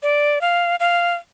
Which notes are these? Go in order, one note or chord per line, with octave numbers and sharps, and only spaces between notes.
D5
F5
F5